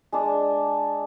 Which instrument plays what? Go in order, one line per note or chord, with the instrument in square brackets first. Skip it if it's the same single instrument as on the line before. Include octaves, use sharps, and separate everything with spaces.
[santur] G#3 D4 A5